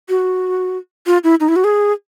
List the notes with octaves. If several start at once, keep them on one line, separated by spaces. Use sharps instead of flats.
F#4
F4
E4
D#4
E4
F#4
G#4